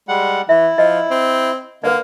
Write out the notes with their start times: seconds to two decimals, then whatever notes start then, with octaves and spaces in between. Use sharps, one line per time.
0.08 G3 G#3 F#5
0.49 E3 E4 E5
0.78 F3 D#5
1.11 C4
1.84 D3 A#3 B4 D5